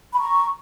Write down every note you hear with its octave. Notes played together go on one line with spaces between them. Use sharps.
B5
A#5 C#6